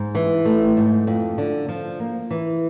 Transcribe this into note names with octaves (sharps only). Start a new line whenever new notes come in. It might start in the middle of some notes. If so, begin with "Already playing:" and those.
Already playing: G#2
E3
A3
G#2
F2
D3
F3
A#3
E3